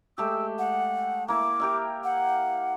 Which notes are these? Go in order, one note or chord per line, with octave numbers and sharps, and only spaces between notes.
G#3 A3 G4 E6
F#5
A#3 E4 D6
G4 A#4 E5
F#5